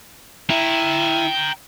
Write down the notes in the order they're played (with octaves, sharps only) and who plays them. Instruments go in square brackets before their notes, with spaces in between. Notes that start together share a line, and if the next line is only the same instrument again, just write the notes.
[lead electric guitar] E4 [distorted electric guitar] G5 A#5